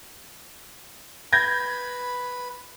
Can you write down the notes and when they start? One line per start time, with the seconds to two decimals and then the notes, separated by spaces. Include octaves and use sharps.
1.33 B4 B5 G6 G#6 A#6